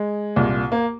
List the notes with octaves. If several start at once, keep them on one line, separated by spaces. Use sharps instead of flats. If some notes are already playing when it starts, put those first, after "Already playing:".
Already playing: G#3
C2 A#2
A#3